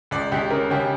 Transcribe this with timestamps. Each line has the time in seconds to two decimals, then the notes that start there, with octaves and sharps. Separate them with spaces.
0.11 C#2 D5
0.32 C#2 G4
0.50 C#3 A#4
0.71 C#3 G4